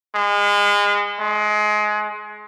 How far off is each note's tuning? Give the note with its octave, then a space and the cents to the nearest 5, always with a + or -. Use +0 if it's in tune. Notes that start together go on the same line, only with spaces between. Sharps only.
G#3 -30
G#3 +25